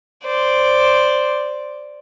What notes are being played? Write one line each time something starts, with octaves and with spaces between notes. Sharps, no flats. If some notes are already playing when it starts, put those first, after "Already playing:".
C5 D5